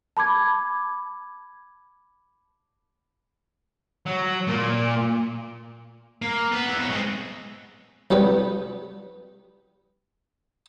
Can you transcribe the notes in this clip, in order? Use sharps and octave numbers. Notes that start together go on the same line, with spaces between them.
A5 B5 D6 G#6
F#3
A#2
A#3
B3
E4 F#5
B2 C#5
G#3 C4
C2 G3 B3 B4